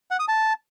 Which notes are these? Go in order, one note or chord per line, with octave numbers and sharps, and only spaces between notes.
F#5
D#6
A5